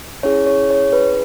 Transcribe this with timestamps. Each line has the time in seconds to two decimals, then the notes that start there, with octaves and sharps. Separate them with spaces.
0.23 C#4 E4 G#4 C#5
0.47 C#5
0.71 C#5
0.93 B4